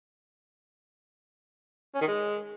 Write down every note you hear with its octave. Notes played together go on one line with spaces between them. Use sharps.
C#4
D#3
G#3